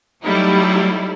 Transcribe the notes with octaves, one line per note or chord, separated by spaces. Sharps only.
F#3 G3 A3 D#4 E4